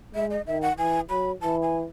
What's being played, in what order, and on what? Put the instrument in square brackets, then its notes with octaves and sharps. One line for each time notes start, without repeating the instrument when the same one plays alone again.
[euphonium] G#3 [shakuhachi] E5
[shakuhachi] D#5
[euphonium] D#3 [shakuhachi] E5
[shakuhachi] F#5
[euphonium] E3 [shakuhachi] G#5
[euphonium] F#3 [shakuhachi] B5
[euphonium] E3 [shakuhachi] A5
[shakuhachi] G#5